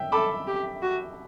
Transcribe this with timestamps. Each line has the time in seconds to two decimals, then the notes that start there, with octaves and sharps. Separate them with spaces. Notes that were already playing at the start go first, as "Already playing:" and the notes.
Already playing: E5 G5
0.12 A4 B5 D6
0.47 G4
0.82 F#4